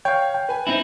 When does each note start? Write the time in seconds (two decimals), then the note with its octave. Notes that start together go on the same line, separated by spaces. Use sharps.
0.05 C#5 F5 G5
0.34 G5
0.49 B4 G#5
0.67 C4 D#4 E4